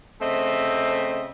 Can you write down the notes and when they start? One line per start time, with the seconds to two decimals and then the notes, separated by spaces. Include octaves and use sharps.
0.21 C#3 A3 C4 C5 D#5 E5